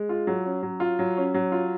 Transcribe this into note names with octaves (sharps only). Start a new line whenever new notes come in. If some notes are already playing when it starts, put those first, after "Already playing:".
Already playing: G#3
F4
F#3
C#4
F#3
F4
F#3
C#4
F#3
F4